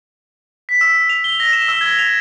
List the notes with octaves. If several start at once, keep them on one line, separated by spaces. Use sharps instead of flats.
B6
E6
F7
G7
A#6
E7
E6
G#6
F7